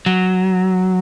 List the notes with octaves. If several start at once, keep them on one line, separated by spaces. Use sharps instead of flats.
F#3